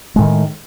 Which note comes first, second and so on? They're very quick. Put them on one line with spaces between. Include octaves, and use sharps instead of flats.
G#3 A2 D#3